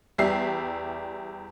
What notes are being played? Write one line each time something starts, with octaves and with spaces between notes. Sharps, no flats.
E2 G3 G4 E5 C7